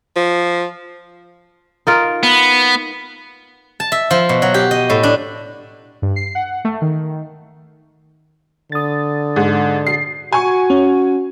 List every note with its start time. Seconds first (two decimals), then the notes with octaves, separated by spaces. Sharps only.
0.16 F3
1.87 D#4 F4 A#4
2.23 B3
3.80 A5
3.92 E5
4.11 F3
4.29 B2
4.42 F#3
4.54 G4
4.71 D#5
4.90 A2
5.03 D4
6.02 G2
6.16 C7
6.35 F#5
6.65 A3
6.81 D#3
8.72 D3 D#6 A6
9.36 G#2
9.87 C7
10.33 F#4 G#5 C#6
10.70 C#4